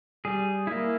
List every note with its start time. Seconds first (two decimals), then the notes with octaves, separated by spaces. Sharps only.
0.25 G3 G#4
0.67 A#3 E4